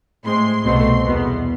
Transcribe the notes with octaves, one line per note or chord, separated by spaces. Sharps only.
A2 G#3 C4 C6
C2 B2 A3 C4 C6
E2 B2 B3